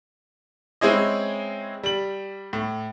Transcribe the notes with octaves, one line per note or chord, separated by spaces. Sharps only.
G#3 C4 C#4 E4 G#4 D#5
G3 F#7
A2